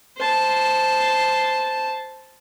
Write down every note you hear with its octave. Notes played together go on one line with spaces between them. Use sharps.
C5 A5